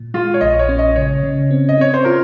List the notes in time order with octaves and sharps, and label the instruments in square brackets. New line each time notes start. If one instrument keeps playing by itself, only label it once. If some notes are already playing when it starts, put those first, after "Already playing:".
Already playing: [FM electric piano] A#2
[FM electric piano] G#3 [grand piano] F4
[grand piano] C#5
[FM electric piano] A#1 [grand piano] D#5
[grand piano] C#5
[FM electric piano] C#4
[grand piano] D#5
[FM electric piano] C#3 [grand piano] C#5
[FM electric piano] C#3
C4
[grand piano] D#5
[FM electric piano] C4 [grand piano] C#5
[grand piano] C5
[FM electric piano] F4 [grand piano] A#4